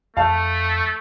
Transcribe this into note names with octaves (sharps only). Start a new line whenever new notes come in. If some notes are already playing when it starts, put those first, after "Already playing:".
F2 A3 F5 A5